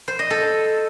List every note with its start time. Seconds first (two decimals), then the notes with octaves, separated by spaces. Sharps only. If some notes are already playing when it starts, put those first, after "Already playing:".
0.08 C5
0.19 D#5
0.30 A4